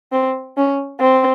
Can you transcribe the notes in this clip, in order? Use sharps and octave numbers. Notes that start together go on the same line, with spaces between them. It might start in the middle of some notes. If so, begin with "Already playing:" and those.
C4
C#4
C4